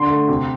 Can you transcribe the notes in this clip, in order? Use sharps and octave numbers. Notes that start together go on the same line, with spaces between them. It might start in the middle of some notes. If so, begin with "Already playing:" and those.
Already playing: D3 C6
A3
C3